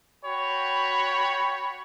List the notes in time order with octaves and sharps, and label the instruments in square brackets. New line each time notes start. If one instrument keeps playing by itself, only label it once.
[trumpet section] F#4 C#5 G5 B5